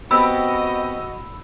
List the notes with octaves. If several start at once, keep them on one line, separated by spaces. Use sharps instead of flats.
B3 C4 F#4 G4 D#5 B5 E6